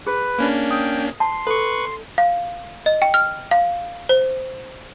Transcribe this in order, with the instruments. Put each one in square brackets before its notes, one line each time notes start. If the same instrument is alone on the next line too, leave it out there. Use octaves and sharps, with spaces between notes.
[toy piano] G#4 [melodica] B4
[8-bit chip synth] A#3 C#4 D4
[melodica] G5 [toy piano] D#6
[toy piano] A5 [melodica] C6
[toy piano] A4 [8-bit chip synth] B4 C#6
[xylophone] F5
D#5
G5
F6
F5
C5